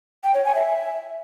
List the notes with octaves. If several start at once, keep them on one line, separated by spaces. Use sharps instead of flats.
G5
C#5
G#5
E5